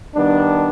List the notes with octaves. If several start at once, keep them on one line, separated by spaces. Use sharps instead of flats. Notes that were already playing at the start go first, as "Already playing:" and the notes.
D#3 G3 B3 D4